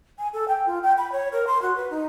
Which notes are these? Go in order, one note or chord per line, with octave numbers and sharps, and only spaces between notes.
G#5
A4
G5
F4
G5
B5
C#5
A#4
C6
F#4
B4
D#4